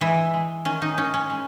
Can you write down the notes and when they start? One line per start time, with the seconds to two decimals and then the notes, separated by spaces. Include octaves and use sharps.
0.01 E3 G#3 E4
0.34 G#3
0.65 D#3 C#4
0.82 D#3 D#4
0.97 D#3 C#4
1.14 C#4
1.30 G#3